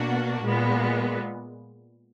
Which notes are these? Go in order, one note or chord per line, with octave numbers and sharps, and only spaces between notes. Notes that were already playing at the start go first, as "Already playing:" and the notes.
Already playing: B2 A#3 D4 F#4
A#2 G#3 B3